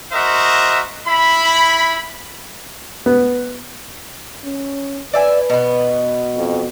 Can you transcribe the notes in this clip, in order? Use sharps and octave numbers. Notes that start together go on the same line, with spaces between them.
F#4 A#4 C5 D#5 E5
E4 B5
B3
C#4
B4 D5 E5 G#5
B2 B3
F2